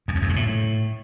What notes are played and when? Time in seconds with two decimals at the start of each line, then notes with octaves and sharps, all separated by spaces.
0.08 F2
0.15 E2
0.22 F#2
0.29 G2
0.36 A2